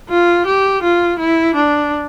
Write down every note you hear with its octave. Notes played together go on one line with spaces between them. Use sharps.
F4
G4
F4
E4
D4